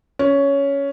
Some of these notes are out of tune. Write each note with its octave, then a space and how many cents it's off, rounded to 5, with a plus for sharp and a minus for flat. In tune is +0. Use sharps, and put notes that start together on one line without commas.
C#4 +10